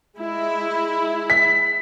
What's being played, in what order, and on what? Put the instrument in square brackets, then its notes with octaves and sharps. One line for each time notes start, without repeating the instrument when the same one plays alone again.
[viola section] G#3 E4
[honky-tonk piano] B6